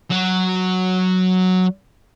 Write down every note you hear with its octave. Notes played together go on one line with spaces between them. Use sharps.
F#3 F#4